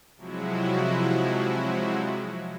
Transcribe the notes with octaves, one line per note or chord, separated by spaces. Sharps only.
C3 F3 F#3 G#3 E4 F#4